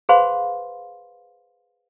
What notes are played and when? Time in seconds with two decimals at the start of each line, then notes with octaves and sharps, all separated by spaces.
0.09 G#4 B4 C5 F5 B5 C6